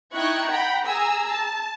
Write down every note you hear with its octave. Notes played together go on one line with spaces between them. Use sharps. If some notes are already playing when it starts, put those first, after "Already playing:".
D#4 E4 G5 C#6 F#6 G#6
F#5 G5 A#5 B5
G#4 G#5 A#5 E6
A5